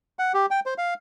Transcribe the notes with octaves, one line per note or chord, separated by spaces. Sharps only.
F#5
G4
G5
C5
F5